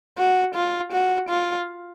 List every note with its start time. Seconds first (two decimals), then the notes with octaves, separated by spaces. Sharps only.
0.18 F#4
0.55 F4
0.93 F#4
1.29 F4